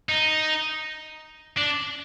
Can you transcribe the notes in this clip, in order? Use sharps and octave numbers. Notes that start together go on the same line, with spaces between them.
D#4
D4